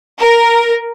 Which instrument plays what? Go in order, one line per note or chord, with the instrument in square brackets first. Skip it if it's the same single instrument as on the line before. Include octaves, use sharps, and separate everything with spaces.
[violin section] A#4